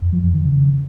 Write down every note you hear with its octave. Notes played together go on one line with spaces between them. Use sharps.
F2
F3
F2
D#3
C#3